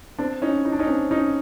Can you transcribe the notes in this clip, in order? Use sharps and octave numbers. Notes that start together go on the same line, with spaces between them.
C4 D4
C#4 D#4
D#4
D4
C#4 D#4
C4 D4
C#4 D#4